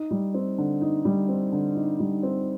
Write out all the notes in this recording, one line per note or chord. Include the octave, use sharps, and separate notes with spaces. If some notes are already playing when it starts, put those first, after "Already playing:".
Already playing: D#4
G3
C4
D3
D#4
G3
C4
D3
D#4
G3
C4